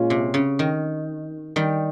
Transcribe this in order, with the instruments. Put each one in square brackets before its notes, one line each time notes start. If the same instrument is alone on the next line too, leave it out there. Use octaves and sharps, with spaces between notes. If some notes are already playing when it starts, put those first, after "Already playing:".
Already playing: [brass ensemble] A#2 G#3 C#4 F4
[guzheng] C3
C#3
D#3
D#3 G3